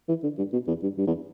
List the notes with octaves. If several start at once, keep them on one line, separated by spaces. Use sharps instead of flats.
E3
D3
G2
B2
E2
G2
G2
E2